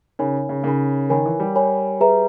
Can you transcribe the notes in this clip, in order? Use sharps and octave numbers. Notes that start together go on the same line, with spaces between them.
C#3 D#4 A#4 C#5 G#5 B5
C#3
C#3 D#4 A#4 C#5 G#5 B5
D#3 A#4 C#5 G#5 B5
E3
G3
A#4 C#5 G#5 B5
G#4 B4 E5 A#5